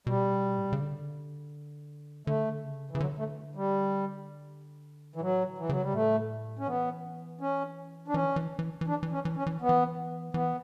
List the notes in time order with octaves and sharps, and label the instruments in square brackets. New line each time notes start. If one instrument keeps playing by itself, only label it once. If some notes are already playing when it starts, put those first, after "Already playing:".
[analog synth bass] B2 [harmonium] G3
[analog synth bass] A2
B2
C#3
D3
[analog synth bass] D3 [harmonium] A3
[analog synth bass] C#3
[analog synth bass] C#3 [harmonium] E3
[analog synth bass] D3 [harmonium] F#3
[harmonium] A3
G3
E3
[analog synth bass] A2 [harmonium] F#3
[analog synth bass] D3
[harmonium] E3
[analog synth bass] C#3 [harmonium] F#3
[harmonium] G3
[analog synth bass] A2 [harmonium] A3
[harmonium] C#4
[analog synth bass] E3 [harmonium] B3
[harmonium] C#4
D4
[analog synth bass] E3 [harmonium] C#4
[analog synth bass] E3
E3
E3
[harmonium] D4
[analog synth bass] E3
[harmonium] C#4
[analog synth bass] E3
[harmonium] C#4
[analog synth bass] E3
[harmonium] B3
[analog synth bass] E3
[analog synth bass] E3 [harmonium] B3